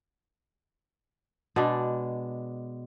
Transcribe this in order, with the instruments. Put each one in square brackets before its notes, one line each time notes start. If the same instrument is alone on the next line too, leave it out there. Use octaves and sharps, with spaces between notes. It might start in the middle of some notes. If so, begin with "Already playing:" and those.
[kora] B2 G#3 D4